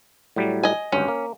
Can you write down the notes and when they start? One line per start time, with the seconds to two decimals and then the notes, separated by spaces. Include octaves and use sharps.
0.36 A2 F#3 G3
0.63 D#5 G#5
0.92 G#1 D2 G2 C#4
1.08 A#3